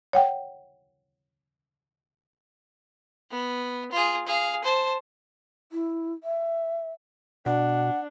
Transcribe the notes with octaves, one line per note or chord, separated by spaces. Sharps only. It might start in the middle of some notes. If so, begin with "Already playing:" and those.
C#5 F#5 G5
B3
F4 G#4
G#4 F5
C5 A5
E4
E5
B2 D4 F#5